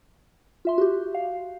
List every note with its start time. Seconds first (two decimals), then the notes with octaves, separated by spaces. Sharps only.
0.65 F4 E5 C6
0.78 F#4 G4
1.15 F5